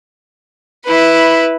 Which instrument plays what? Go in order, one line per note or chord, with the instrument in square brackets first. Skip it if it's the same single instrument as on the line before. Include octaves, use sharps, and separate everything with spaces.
[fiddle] E4 B4